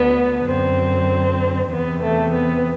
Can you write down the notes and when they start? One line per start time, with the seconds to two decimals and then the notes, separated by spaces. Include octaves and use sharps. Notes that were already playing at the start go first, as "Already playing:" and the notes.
Already playing: D2 D3 B3
0.47 F#2 D3 C4
1.70 E2 C3 E3 B3
2.02 A3
2.33 B3